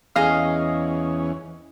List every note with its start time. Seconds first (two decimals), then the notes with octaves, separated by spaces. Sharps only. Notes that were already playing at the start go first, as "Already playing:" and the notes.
0.16 E2 C#4 G#4 D#5 F5